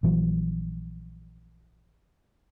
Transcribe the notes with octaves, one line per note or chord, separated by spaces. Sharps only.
A#1 E3 F#3